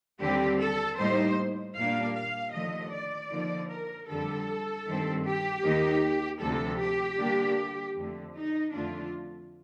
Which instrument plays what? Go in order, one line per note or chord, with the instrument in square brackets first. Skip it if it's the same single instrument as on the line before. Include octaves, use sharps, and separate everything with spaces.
[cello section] D#2 D3 G3 C4 G4
A4
A2 G3 A#3 D#4 C5
A#2 G3 A#3 D4 F5
F5
D#2 D3 F3 A3 D#5
D5
D3 F3 A#3 D#4
A#4
F2 D3 G3 A4
G2 D#3 A3 C4
G4
D#2 D#3 A#3 D#4
D2 C3 F3 A4
G4
D3 G3 A#3 D4
F2 D3 A3
D#4
F2 D3 A3 D4 F4